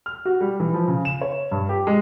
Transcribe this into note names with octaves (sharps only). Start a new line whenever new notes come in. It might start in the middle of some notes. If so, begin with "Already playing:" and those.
F6
F#4
G3
E3
F3
C#3
E7
C#5
G2
G4
G#3